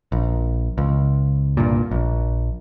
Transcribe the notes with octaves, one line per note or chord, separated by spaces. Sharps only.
A#1
C#2
C2 G2 A#2
A#1